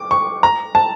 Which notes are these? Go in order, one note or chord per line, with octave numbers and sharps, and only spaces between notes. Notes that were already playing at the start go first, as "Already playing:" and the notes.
Already playing: D6
C#6
A#5
A5